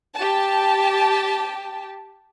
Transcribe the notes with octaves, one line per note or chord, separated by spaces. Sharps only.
G4 A5